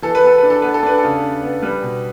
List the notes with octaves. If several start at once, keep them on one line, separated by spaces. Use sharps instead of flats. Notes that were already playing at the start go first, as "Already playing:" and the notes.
E3 A4
B4
B3 A4
D4 B4
A4
B3 B4
A4
D4 B4
A4
C#3
D4
B3
G3 B4
B2